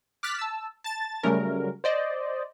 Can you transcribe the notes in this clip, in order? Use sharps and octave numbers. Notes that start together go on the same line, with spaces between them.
D6 F6 F#6 A6 B6
A5 E6
A5 A6
C#3 F#3 G3 A3 C#4 A#4
C5 D5 D#5